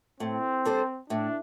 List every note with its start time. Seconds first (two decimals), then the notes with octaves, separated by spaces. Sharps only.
0.20 A2 C4
0.65 G3 D4 A4 C5
1.10 A2 D4